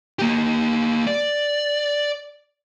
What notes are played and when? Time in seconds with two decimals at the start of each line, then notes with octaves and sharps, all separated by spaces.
0.19 A#3 G4
1.07 D5